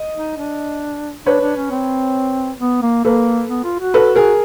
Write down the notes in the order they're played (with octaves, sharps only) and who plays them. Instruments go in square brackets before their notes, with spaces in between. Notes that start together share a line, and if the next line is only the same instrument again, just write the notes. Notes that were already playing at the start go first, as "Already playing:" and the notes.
Already playing: [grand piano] D#5
[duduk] D#4
D4
[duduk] D4 [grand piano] B4 C#5
[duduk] D4
C#4
C4
B3
A#3
[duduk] A#3 [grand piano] A4 B4
[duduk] B3
F4
F#4
[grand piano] A4 B4
G#4 A#4